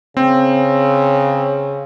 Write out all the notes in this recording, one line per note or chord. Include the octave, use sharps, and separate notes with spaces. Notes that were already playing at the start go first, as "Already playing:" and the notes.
C#3 C4